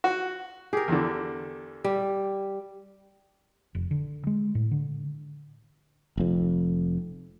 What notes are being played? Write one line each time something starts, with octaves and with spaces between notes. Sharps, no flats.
F#4
G4 G#4 A#4
E2 D3
G3
F1
D3
G#3
A2
D3
F1 F2